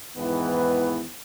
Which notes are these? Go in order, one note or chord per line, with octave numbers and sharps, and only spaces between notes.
E2 G#2 D#3 E3 B3